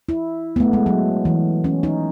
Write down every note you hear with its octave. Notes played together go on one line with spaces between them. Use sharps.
E4
B3
A3
G#3
F#3
E3
C#4
D#4